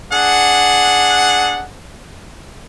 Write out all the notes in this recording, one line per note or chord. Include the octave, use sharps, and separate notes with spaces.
D4 G#4 F#5